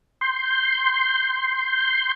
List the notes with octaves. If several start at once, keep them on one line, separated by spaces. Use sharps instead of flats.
C6 G6